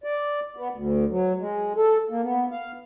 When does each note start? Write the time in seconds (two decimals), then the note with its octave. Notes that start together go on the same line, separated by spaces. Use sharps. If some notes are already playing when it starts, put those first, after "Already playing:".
0.04 D5
0.57 B3
0.75 D2
1.10 F#3
1.39 G#3
1.76 A4
2.10 A#3
2.23 B3
2.51 F5